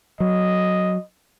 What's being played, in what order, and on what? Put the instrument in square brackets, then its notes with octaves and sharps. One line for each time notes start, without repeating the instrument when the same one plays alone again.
[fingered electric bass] F#3 [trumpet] D#5